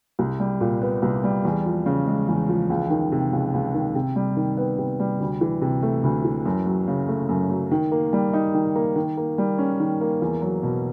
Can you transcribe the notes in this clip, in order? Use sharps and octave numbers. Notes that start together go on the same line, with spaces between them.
C2
G3
A#2
B3
C2
G3
E2
F3
C#3
G#3
E2
F3
C#2
D#3
C3
C#2
C#2
D#3
C3
G3
D#3
B3
C3
G3
D2
E3
C3
A3
D2
E3
F#2
F#3
C#3
A3
F#2
F#3
D#3
A#3
G3
D#4
D#3
A#3
D#3
A#3
G3
C#4
D#3
A#3
E2
F#3
B2